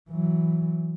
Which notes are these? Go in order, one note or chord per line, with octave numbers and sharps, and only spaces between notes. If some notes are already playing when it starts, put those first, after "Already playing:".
E3 F#3